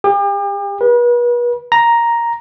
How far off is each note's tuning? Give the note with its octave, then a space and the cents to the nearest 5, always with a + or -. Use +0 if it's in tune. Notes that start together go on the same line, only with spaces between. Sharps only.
G4 +40
B4 -40
A#5 +5